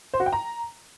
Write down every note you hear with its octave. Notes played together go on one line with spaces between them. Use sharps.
C5
F#4
G5
A#5